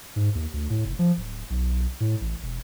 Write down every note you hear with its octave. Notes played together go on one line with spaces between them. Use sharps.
G#2
D#2
D2
A2
F1
F3
D1
B1
A2
A1
E1